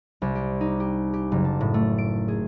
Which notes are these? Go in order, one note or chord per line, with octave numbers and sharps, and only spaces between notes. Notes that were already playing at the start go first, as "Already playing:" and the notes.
C2
G4
D#4
G4
G4
F#1
A5
A2
A3
D7
G#4